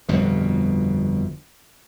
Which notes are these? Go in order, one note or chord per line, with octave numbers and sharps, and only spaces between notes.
G1 F2 B2